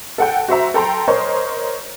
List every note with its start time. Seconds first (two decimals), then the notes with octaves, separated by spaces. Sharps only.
0.18 A4 F#5 G5
0.48 F#4 C5 E5 A#5
0.74 A4 G5 A#5 C6
1.08 A#4 C5 C#5 D#5